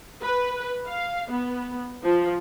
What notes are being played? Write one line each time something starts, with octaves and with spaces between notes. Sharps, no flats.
B4
F5
B3
F3